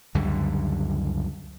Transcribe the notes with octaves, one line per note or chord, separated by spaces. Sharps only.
C#2 F#2 D3 G3